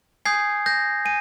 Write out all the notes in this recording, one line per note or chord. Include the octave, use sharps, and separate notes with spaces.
G#5 D#6 G6 G#6 C7
G6 A#6
G#5 D#7